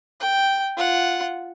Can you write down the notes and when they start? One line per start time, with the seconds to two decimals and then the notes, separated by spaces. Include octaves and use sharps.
0.20 G5
0.77 F4 F#5